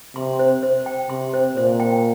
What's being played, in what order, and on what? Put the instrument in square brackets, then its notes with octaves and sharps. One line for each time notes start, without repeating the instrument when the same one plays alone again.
[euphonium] C3 [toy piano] C6
[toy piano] C5
C5
G5
[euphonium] C3 [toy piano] C6
[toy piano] C5
[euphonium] A#2 [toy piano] C5
[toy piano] G5